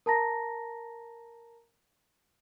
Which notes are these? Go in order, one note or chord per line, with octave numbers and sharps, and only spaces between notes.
A#4 A5 A#5 A#6